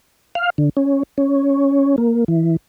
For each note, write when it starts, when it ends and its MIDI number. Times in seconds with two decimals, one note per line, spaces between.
0.35 0.50 77
0.58 0.69 50
0.77 1.03 61
1.18 1.96 61
1.98 2.24 58
2.28 2.56 52